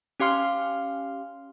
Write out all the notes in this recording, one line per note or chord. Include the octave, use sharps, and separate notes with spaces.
C#4 G4 F5 C6 F6